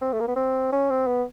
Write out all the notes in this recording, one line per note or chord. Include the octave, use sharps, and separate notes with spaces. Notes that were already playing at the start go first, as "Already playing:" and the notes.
C4
A3
A#3
B3
C4
C#4
C4
B3